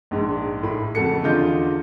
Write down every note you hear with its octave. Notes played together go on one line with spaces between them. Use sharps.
A#1 G#2
A2 B5
F2 C#3 F#4 A4 C#7
E2 D3 F4 D#5 G6